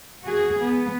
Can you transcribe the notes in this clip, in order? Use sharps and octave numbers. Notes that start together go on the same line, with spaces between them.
F#4 G#4
B3